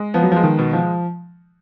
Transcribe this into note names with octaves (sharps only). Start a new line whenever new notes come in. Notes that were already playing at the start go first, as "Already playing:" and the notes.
Already playing: G#3
F3 B3
F#3
F3 G#3
D#3
B2
F3